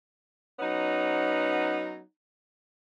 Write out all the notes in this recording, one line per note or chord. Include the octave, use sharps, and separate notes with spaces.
F#3 B3 C#4 D#4